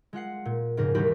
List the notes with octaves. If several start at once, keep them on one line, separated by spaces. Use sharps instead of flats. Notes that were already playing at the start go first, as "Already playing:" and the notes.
G#3 F4 F#5 C7
A#2
F2 G#2 C#3 A#4
E1 D#2 G3 G4 A#4 B5